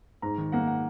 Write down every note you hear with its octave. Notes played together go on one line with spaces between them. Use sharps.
G#2 A#5
D#3
A#3 F#5
F#5